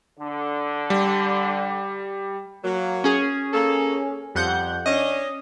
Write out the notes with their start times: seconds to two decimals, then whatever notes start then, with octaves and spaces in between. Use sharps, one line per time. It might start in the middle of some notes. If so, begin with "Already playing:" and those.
0.18 D3
0.90 G3
2.64 F#3 A#3
3.04 C#4 G#4
3.53 A#3 A4
4.35 F2 G3 F#5 G6
4.86 C#4 D4 D#5